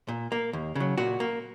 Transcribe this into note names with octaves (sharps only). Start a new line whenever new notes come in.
A#2
A#3
D#2
C#3 F#3
A#2 F#4
A#3